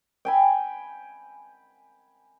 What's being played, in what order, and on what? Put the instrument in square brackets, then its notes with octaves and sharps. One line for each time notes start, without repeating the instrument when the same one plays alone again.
[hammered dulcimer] G5 G#5 B5